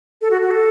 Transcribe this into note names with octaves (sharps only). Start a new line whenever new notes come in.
A4
F#4
F#4
A4